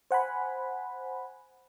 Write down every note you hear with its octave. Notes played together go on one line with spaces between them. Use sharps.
C5 F#5 G#5 B5